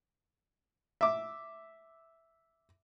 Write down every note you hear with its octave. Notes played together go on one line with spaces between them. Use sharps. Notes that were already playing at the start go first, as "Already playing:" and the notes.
E5 D6